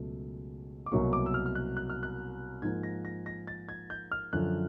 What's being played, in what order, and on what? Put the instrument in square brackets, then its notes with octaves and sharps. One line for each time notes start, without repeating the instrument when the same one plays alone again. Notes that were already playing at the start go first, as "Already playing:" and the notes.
Already playing: [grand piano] C#2 B2 F#3 A3
D6
C2 B2 F#3 A#3 C#6
D6
E6
F6
F6
F#6
F#6
F6
F#6
G#2 F3 A#3 G#6
A#6
A#6
A#6
A6
G#6
G6
F6
F#2 D3 F3 F#6